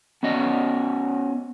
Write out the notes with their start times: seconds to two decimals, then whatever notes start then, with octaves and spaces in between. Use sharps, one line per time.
0.23 B3 C#4 F#4 D#5